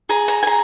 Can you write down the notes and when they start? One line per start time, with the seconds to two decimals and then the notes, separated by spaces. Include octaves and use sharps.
0.09 G#4 A#5
0.28 A#5
0.43 G#5
0.47 G#4 A#5